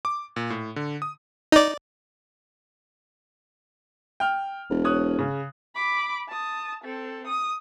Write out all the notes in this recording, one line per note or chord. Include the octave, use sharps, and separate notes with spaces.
D6
A#2
A2
D3
D#6
D#4 D5
G5 F6
E1
C#5 D#6 F#6
C#3
B5 D6
A5 D#6
C4 A4
D#6